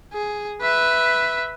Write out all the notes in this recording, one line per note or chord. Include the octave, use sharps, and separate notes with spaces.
G#4
B4 E5